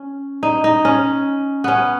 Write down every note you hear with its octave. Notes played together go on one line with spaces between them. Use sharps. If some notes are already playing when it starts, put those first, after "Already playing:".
Already playing: C#4
D#4
D#4
C#4
B3 C#4